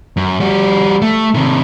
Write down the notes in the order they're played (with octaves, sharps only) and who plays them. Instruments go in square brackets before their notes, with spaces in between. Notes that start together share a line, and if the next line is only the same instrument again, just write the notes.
[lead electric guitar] F#2
G3 F#4
A3
C3 D#3